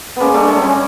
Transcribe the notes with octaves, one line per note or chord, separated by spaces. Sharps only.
G#3 A#3 B3 C#4
G3 A3
D4
G#3
F#3
G3 C#4